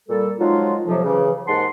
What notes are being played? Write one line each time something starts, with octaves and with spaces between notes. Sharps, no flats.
A#2 G3 A4
F3 F#3 G#3 D#4 F4
F2 C3 F3 F#3
C#3 E3
D#2 G#2 F#5 A5 C6